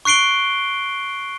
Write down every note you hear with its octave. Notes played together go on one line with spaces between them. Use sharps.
C#6 F#6 C7 D7 G7